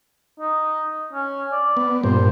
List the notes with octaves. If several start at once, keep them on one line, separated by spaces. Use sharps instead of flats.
D#4
C#4
D5
B3
G2 A#2 C5